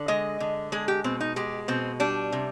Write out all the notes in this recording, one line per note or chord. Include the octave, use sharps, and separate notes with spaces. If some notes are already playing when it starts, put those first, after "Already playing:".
Already playing: D3
G#3 D#5
D3
G#3 G#4
G4
B2 C4
D#4
G#3 G4
B2 C4
G3 D4
C3